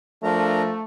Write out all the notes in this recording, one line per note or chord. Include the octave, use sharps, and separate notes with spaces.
F3 A3 D4 A#4 A#5